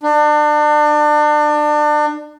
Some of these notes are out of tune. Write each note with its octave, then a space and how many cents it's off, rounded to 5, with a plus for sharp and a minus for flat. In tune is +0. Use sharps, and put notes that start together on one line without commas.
D4 +30